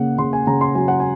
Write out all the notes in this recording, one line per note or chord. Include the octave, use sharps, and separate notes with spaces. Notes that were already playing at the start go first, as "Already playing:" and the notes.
Already playing: C#3 A#3 F#5
C#3 C6
G#5
C#3 A#5
C6
F#3 G#5
F#5
G#5